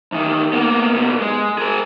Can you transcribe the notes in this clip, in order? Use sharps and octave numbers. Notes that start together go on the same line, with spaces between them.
E2 D#3
A#3 B3
C2 B3
G#3
G#4 A#4